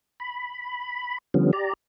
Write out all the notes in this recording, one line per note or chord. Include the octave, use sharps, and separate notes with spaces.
B5
D3 F3 G3 B3 C#4
G4 D5 A#5